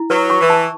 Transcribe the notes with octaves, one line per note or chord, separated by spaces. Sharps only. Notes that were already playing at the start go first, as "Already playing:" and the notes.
Already playing: E4
F#3 B4
C#6
E3
A5